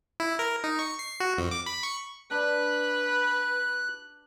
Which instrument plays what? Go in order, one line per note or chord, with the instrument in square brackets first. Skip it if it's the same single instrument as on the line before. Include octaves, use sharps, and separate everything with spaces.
[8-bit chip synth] E4
A#4
D#4
C#6
C7
F#4
F2
D6
B5
C#6
[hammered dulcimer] D4 [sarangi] B4 [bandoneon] F#6